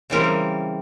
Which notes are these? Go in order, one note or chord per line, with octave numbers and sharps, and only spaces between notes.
C#3 E3 G3 C4 A#4